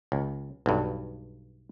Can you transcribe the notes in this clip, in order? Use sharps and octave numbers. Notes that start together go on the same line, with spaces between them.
C#2
B1 G2